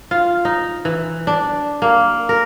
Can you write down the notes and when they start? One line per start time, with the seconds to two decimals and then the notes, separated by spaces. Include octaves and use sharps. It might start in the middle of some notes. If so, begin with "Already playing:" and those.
0.11 F4
0.45 D#4
0.85 E3
1.27 D4
1.82 A#3
2.29 A#4